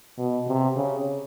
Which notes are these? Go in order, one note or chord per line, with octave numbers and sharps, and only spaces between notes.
B2
C3
C#3